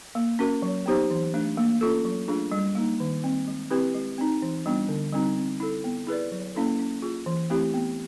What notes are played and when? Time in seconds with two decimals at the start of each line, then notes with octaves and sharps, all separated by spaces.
0.15 A#3
0.39 C#4 F#4 A#4
0.62 F#3
0.86 B3 D#4 G4 C5
1.11 E3
1.34 A3 D4
1.57 A#3
1.81 C#4 F4 A4
2.05 F#3
2.28 A3 D4 F4 G#4
2.52 G3
2.75 A#3 D#4
3.00 D#3
3.24 G3 C4
3.47 G#3
3.70 C4 E4 G4 B4
3.95 G#3
4.18 C4 D#4
4.42 E3
4.66 G3 B3 D4 F4
4.89 D3
5.13 G3 C4 D#4 F#4
5.36 C4
5.60 E4 A4
5.84 B3
6.07 E4 G#4 B4 D5
6.32 F#3
6.55 A#3 C#4 E4 A4
6.79 C#4
7.02 F4 G#4
7.26 E3
7.50 A3 C4 E4 G4
7.74 B3